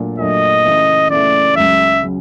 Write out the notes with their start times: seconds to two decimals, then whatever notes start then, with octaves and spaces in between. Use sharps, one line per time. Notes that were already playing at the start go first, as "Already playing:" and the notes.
Already playing: A#2 F#3 A3 D4
0.18 A#2 F#3 A3 D4 D#5
0.64 C#3 E3 A3
1.10 C#3 E3 A3 D5
1.55 C#2 C#3 F#3 E5
2.03 C#3 F#3